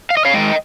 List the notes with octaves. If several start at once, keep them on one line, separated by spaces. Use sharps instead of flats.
F5
D#5
C#5 F5
D#3 G#3 D#5 G5